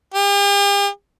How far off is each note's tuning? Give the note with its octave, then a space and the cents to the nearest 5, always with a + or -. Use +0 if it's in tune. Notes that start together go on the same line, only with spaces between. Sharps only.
G4 +45